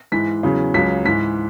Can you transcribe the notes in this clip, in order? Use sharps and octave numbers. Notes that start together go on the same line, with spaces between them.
G#2 E3 B6
E2 C#3 F#3
C#2 C#3 F#3 B6
G#2 E3 B6